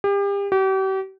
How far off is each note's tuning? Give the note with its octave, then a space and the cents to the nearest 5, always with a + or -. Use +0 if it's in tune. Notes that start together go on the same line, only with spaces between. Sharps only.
G4 +35
G4 -40